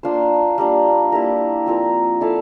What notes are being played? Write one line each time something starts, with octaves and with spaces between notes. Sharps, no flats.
A#3 D4 F4 C5
G3 A#3 D4
A#3 E4 G4 A#4
F3 C4 F4 A#4
E4 A4 D5 F5